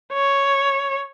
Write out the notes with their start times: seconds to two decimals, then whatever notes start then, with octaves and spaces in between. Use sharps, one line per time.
0.13 C#5